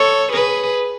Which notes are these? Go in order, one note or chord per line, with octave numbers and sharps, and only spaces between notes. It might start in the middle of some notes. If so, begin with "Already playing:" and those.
Already playing: A4 C#5
G#4 B4